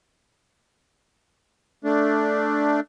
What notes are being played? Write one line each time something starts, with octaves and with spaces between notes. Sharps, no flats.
A3 D4